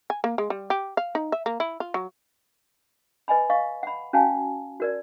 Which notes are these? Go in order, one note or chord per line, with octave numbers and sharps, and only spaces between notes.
G#5
A#3
G#3
G3
G4
F5
D#4
E5
A#3
E4
F4
F#3
B4 D#5 G#5 B5
D#5 F5 C#6
F#5 B5
C#4 F#4 F5 G#5 A5
F#4 A#4 D5